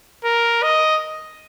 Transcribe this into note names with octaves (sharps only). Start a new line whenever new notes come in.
A#4
D#5